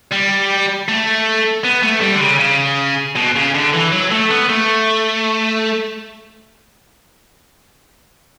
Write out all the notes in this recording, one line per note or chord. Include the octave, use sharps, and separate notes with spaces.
G3
A3
B3
A3
G3
D3
C#3
C#3
B2
C#3
D3
E3
F#3
A3
B3
A3